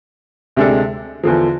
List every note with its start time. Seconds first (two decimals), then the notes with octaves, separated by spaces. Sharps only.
0.56 D2 C3 G#3 D4 A4
1.23 E2 D3 F3